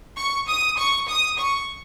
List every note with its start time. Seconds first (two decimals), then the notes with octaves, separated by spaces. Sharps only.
0.16 C#6
0.48 D#6
0.77 C#6
1.08 D#6
1.38 C#6